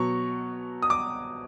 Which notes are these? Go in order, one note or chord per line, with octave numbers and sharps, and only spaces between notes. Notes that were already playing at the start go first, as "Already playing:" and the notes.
Already playing: B2 F#3 C#6
D#6
D6